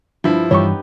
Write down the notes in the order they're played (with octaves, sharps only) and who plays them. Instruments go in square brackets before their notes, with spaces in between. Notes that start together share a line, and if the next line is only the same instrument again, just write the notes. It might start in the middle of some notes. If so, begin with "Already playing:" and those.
[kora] G2 [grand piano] F3 E4
[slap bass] G2 E3 G3 [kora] B3 D#4 G4 [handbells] C#5 C#6